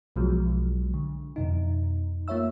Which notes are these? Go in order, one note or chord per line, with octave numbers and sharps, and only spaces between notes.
B1 B2 F3 F#3 G#3
D3
F2 B2 D#4
A#3 F4 C#5 E5 E6